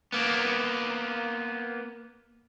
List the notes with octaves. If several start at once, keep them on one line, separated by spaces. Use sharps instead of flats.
A#3 B3